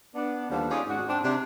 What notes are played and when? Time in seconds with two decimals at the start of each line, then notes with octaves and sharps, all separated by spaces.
0.15 B3 D4
0.49 D#2 D3 F3 G3 B3 D4
0.70 C#4 D#4 F4 G#4 D5
0.88 G#2 F#4
1.08 C4 D4
1.24 C3 D4